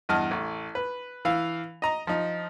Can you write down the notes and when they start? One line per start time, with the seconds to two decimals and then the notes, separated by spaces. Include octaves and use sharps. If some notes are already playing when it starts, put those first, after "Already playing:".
0.09 E2 G2 D#5 A5 F6
0.31 A1
0.75 B4
1.25 E3 F5
1.82 D#5 A#5
2.07 F3 D#4